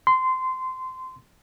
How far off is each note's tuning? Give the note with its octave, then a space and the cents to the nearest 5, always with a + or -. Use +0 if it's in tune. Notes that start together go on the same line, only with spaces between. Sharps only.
C6 -20